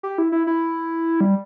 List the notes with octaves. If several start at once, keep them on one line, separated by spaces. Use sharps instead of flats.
G4
E4
E4
E4
G3